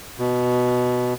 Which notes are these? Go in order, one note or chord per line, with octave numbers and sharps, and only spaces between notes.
B2